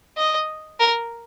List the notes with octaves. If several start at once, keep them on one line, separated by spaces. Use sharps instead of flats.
D#5
A#4